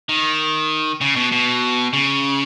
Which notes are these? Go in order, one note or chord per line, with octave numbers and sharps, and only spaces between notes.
D#3
C#3
B2
B2
C#3